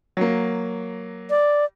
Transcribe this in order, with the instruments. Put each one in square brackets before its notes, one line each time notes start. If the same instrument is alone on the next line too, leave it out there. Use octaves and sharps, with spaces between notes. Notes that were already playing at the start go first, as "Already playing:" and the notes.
[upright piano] F#3 A#3
[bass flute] D5